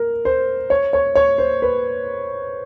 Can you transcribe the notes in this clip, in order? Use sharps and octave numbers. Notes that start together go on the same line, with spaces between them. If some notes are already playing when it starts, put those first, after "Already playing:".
Already playing: A#4
C5
C#5
C#5
C#5
C5
B4